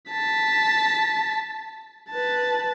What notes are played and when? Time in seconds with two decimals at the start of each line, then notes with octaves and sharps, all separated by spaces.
0.10 A5 B6
2.10 B4 A5